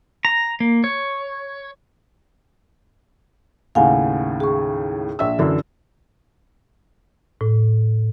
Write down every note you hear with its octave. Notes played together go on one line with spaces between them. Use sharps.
A#5
A#3
C#5
D#2 A2 C#3 F5 F#5 G#5
G#4 C#6
A#1 E5 E6
F#2 D3 E3
A2